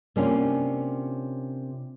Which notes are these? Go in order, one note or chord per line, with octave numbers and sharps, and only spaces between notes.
C3 A#3 C#4 D4 F4